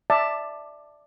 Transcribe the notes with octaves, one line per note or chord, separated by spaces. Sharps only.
D5 E5 A5